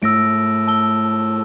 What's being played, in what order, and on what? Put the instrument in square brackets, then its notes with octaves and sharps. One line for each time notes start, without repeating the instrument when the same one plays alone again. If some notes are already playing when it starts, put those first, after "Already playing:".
[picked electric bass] G#2 A3 [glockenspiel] E6 A#6 D7
[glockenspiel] A5 E6 G7